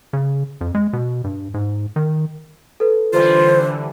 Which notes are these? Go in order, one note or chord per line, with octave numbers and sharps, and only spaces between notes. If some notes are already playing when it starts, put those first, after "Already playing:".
C#3
F2
G#3
B2
G2
G#2
D#3
A4 B4
D3 E3 G3 F4 C5